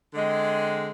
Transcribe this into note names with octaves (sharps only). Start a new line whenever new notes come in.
D3 G#3 C4